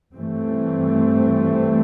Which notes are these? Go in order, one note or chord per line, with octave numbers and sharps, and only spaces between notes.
G2 E3 A3 C4